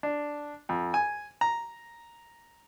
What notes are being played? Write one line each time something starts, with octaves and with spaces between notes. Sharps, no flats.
D4
F2
G#5
A#5